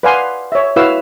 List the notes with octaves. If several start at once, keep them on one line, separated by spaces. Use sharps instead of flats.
B4 D5 F5 F#5 G#5 C6
C#5 E5
E4 F#4 B4 C#5 F5 E6